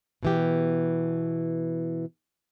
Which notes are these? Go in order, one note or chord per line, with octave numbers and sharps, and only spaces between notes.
B2 E3 G4